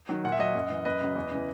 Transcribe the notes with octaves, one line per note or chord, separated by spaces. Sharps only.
D#3 F#3
A#2 F#5
E5
F#3 D#5 F#5
F#2
E3
F#2 B4 D#5
C#3 F#3
E2
C#3 E3